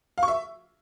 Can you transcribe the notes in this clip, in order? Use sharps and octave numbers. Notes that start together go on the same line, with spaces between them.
F5
C#6
E5